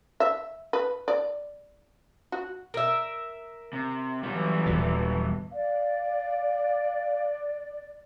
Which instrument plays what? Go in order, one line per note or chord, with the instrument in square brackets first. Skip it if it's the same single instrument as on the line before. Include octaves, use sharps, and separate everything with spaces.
[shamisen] E5
B4
D5
F#4
[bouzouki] A#4 E5
[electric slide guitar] C3
[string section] E3 F#3 [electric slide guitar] G3 B3
[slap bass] D#1 A#2
[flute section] D5 [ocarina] F5